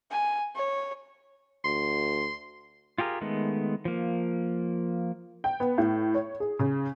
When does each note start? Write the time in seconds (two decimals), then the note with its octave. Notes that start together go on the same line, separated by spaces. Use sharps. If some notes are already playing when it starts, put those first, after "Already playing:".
0.11 G#5
0.55 C#5
1.65 D2 C6
2.98 F4 G4 G#4 A#4
3.21 D#3 G#3 A3 B3
3.85 F3 A#3
5.44 G5
5.60 B3
5.78 A2
6.14 C#5
6.40 G#4
6.59 C#3